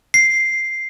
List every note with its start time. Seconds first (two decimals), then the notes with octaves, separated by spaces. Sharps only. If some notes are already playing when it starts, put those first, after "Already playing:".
0.14 C7